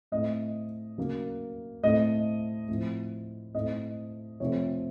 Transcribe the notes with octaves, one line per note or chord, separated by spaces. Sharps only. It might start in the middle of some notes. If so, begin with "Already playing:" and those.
A2 A3 C4 D#5
C#3 F#3 A#3
A2 A3 C4 D#5
A2 F3 C4
A2 A3 C4 D#5
F2 C3 F3 A3 C4 C#5